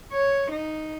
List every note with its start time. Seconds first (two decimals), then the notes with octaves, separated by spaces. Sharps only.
0.13 C#5
0.51 D#4